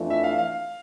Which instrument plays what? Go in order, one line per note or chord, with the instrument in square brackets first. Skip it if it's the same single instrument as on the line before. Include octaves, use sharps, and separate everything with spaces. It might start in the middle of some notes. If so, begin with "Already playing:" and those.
Already playing: [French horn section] F2 E3 A3 D4 F4
[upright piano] E5
F5
F5